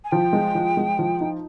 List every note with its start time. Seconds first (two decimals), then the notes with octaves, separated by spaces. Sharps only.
0.04 G#5
0.11 F3 G5
0.33 G#3
0.55 F3
0.77 G#3
0.99 F3
1.21 D#4